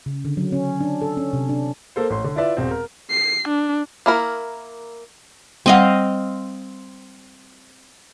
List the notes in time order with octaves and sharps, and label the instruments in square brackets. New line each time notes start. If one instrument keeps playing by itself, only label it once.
[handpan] C#3
D3
F#3
C#4
D4
A4
C#4
C3
D4
[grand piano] A#3 A4 C5
A1 C6
D3
E4 F4 B4 D5 E5
E1 C4
A#4
[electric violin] C7
D4
[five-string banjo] A#3 E4 A#4
[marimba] G3 F#5 [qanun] C4 D#5 F5